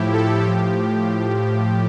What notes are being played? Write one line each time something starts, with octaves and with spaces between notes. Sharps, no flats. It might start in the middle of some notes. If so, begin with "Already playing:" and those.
Already playing: A2 F3 E4 G4
A4
A2 F3 G4